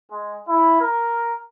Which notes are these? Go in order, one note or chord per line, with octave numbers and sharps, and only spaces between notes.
G#3
E4
A#4